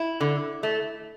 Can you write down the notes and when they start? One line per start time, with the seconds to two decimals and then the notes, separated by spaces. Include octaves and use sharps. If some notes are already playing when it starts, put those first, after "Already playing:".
Already playing: E4
0.21 D3
0.63 A3